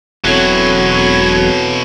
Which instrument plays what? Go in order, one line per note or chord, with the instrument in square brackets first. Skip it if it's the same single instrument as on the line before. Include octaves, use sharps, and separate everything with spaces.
[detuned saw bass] E1 [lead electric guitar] B2 E4 [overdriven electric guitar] F#3 [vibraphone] C4 A4 C#5